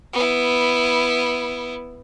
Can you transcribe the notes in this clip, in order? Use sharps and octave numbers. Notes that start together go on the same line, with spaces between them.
B3 E4